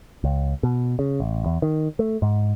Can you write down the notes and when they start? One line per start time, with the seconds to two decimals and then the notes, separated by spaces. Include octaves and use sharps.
0.24 C#2
0.63 B2
0.99 C#3
1.20 A1
1.46 E2
1.62 D#3
1.99 A3
2.22 G#2